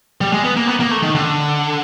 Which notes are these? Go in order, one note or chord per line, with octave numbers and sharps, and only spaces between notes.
G3
G#3
B3
A#3
B3
A#3
A3
D#3
D3